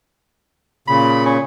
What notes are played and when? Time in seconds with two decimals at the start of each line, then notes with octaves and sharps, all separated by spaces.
0.88 A#2 C#3 B5
1.26 C#4